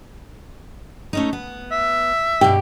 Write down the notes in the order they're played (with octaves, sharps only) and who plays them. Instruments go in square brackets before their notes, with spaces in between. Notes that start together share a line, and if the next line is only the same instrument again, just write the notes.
[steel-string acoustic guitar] A3 C#4 D#4
B3
[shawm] E5
[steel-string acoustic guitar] G2 B2 [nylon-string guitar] G4